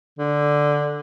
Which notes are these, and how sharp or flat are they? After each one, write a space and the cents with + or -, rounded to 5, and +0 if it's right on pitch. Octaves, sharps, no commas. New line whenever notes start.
D3 +0